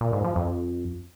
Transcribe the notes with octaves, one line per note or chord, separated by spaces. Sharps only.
A#2
G#2
F3
F2